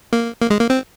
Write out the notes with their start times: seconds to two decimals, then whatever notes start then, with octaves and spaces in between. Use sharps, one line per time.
0.13 A#3
0.41 A#3
0.50 G#3
0.60 A#3
0.70 C4